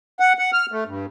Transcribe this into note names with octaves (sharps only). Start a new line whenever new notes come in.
F#5
F#5
F6
A3
G2